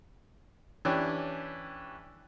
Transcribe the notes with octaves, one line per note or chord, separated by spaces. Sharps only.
E3 C#4 D4 G4